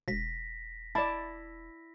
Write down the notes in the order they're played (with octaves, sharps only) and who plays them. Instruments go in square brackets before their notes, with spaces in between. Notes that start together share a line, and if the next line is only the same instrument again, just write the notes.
[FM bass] E1 [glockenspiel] A#6 B6
[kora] E4 [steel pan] D5 A5